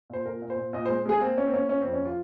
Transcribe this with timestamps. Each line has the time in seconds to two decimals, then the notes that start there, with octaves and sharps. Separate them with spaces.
0.10 A#2 C5
0.25 A#2 A#4
0.42 A#2
0.50 C5
0.57 A#2
0.73 A#2 D#5
0.85 G#3 C5
1.06 G#3 G#4
1.21 A#3 C4
1.38 A#3 C#4
1.47 C4
1.54 A#3 C#4
1.69 A#3 C#4
1.81 F2 C4
1.93 C#4
2.01 F3 F4